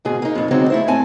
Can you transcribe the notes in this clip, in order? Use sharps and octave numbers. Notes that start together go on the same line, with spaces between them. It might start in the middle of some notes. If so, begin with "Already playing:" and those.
D2 G#2 B2 G#4
A#3 D#4
F2 A#2
D3 F#3 G#3 C4 D#4
A3 E4 C5
A2 C4 G#5 A5